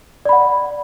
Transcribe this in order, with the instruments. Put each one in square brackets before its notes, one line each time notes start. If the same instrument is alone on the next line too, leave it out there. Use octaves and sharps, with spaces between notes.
[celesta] D5
B5
F#5